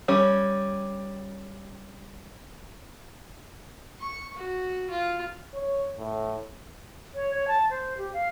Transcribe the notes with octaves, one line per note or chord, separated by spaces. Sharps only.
G3 C#4
C#6
F#4
F4
C#5
A2
C#5
C#5
A5
C5
G4
F5